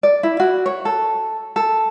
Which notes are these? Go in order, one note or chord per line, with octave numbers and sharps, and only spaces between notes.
D5
E4
F#4
C#5
A4
A4